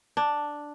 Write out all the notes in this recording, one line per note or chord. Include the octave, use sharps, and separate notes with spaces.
D4